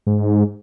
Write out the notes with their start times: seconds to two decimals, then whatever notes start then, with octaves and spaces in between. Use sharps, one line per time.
0.07 G#2